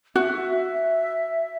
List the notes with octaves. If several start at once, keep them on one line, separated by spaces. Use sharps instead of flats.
F#4 E5